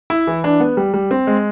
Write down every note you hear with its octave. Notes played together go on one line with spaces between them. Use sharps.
E4
E3
D4
B3
G3
G3
C4
G#3